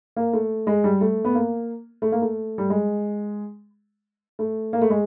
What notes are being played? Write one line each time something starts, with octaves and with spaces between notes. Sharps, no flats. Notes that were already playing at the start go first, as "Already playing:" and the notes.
A#3
A3
G#3
G3
A3
B3
A#3
A3
A#3
A3
G3
G#3
A3
A#3
A3
G#3